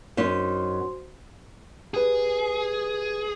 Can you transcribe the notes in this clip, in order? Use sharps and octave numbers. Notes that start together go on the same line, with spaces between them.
F#2 C#4 D#4 F#4 C5 C6
G4 G#4 B4